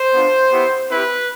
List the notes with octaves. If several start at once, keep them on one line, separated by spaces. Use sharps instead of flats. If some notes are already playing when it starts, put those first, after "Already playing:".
Already playing: C5
B3 D4 F4
B3 E4 G4
C4 E4 G4 B4